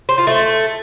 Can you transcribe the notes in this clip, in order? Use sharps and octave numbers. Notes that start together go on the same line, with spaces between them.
C5
F4
A3